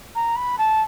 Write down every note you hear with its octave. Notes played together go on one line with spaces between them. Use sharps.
A#5
B5
A5